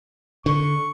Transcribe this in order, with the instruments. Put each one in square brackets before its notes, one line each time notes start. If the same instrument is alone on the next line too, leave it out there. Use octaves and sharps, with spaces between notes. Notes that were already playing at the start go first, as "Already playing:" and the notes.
[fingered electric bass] D3 [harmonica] C#6